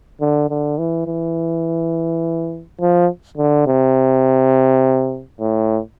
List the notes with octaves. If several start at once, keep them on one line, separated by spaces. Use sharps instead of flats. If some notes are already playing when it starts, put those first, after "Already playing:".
D3
D3
E3
E3
F3
D3
C3
A2